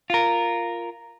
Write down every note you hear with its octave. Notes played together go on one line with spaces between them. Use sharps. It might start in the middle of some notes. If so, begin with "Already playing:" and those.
F4 A#4